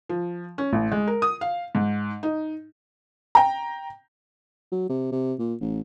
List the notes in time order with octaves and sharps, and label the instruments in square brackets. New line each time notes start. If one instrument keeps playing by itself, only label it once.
[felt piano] F3
C#4
A1
G#3
A#4
D#6
F5
G#2
D#4
G5 A#5
[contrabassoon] F#3
C3
C3
A#2
A1